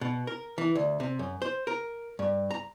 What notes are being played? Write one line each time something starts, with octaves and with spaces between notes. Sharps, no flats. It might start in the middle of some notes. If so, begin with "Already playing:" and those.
B2
A#4
E3
D2
C3
F#2
C5
A#4
G2
A#5